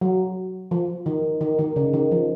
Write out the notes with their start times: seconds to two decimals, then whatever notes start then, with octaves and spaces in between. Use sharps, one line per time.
0.01 F#3
0.71 F3
1.06 D#3
1.41 D#3
1.59 D#3
1.76 C#3
1.93 D#3
2.11 F3